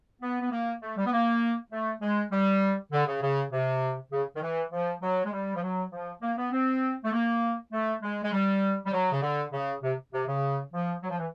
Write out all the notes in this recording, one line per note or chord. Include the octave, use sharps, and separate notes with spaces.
B3
B3
A#3
A3
G3
B3
A#3
A3
G#3
G3
D3
C#3
C#3
C3
C#3
D#3
E3
F3
F#3
G#3
G3
F3
F#3
F3
A#3
B3
C4
A3
A#3
A3
G#3
G#3
G3
G3
F#3
C#3
D3
C#3
C3
C3
C#3
F3
F#3
F3
E3